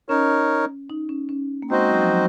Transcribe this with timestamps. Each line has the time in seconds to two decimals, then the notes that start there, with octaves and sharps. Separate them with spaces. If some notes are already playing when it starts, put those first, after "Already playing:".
0.09 C#4 D#4 A#4 C#5
0.90 D#4
1.09 C#4
1.29 C#4
1.62 A#3
1.70 G#3 C4 D#4 F#4 C5 D#5
1.91 F#3
2.01 F3
2.12 F#3